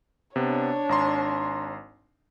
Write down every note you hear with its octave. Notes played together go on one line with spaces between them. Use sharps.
C3 B3 D4 C#5
G#1 A#5 C6